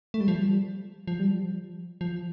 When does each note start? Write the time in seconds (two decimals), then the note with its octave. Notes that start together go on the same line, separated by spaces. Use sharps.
0.14 A3
0.20 G3
0.28 F3
0.36 G3
1.07 F3
1.20 G3
1.31 F3
2.01 F3